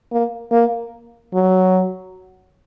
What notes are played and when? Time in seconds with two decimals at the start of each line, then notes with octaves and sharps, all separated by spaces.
0.12 A#3
0.52 A#3
1.34 F#3